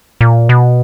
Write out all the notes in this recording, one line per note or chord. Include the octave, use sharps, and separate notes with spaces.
A#2
B2